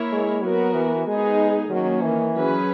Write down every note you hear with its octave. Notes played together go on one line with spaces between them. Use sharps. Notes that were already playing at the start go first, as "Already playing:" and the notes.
Already playing: A#3 E4 A#4 C#5
G#3
F#3 B3 F#4 A#4
E3
G#3 B3 D#4 G#4
D#3 F#3 A#3 C#4
E3
F#3 C#4 G#4 B4